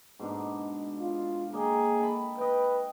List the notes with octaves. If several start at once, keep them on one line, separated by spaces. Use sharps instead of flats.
G#2 B2 D4
F4
A#3 G#4 D#5 G5
G5 A5 B5
B4 D#5 G5